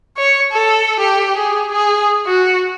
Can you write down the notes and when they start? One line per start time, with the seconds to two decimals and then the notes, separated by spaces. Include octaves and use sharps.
0.17 C#5
0.52 A4
1.00 G4
1.37 G#4
1.72 G#4
2.27 F#4